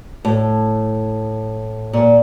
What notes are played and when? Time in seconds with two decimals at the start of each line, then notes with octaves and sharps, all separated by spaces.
0.25 A2
1.93 A#2